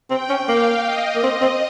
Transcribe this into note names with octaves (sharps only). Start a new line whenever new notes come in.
C4 G5
C#4
A#3 F5
D#5
A#3
C4
C4